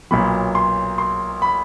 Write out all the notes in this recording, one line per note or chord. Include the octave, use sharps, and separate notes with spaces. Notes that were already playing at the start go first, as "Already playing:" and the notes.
B1 A#2 F#3 B5
C6
C6
B5